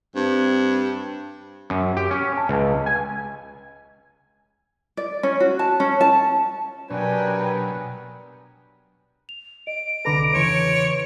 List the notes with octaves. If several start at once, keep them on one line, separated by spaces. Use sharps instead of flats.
G2 C4
F#2
G4
C#4
A5
C#2
G#5
D5
C#4
F#4
A5
C#4
A5
B2 F#3 D4 G4 A#4 B4 G5 G#5
F7
D#5 D7
C2 D3 A4 B4 A#5 B5 D6
E2 C#3 E3 B4 C#5 C6